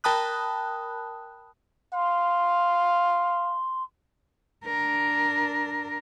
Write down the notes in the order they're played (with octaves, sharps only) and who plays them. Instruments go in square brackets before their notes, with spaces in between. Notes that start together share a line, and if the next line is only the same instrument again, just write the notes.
[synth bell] A#4 G5 A5 B5 D#6 F#6
[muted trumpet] F5 [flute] C6
[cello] D4 A#4